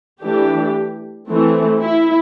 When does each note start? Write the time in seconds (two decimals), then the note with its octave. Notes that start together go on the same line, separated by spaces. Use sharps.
0.21 E3 A3 D4 G4
1.29 E3 A3 C4
1.82 E4